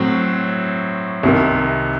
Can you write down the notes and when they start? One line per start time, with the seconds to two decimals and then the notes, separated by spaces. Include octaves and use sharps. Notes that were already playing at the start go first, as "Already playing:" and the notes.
Already playing: A2 F#3 C4
1.23 C2 C3 D#3